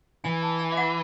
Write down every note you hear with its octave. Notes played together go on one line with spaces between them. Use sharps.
E3 G#5
A5
G#5
E5
F#5